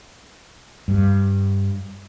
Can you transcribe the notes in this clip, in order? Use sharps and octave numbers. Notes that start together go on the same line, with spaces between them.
G2